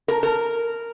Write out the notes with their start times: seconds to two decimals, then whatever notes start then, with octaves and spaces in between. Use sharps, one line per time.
0.08 A#4
0.23 A#4